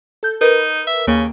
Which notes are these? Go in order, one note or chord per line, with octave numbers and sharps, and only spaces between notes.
A4 G6
D#4 A#4 B4
E5
D#2 C#3 A#3